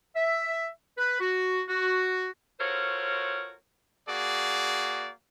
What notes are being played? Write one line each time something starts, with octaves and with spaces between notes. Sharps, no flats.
E5
B4
F#4
F#4
F4 F#4 A4 A#4 C5 C#5
A#3 F#4 G#4 D5